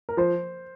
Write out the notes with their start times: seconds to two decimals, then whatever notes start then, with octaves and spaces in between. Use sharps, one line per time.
0.09 A#4
0.17 F3 C5